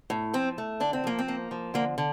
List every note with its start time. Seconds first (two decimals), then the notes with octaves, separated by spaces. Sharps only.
0.10 A2
0.34 F3 C4
0.58 A3
0.80 D3 D4
0.93 C4
1.04 F3 A#3
1.19 C4
1.28 A#3
1.51 F3
1.74 D3 A#3
1.98 D3